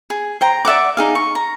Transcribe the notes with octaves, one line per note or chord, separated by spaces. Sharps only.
G#4
C5 G5 A#5
D5 E5 F#5 D6
D#4 G#4 F5
C#6
A#5